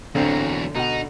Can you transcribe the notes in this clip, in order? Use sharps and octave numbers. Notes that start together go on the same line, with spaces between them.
A1 E2 D3 F#3 C4
B2 D#4 F#5